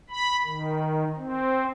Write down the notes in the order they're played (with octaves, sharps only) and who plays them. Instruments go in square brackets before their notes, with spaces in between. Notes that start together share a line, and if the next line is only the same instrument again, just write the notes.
[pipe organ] B5
D#3
C4